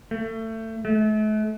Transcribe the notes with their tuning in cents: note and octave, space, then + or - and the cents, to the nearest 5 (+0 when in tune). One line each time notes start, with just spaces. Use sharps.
A3 +25
A3 -40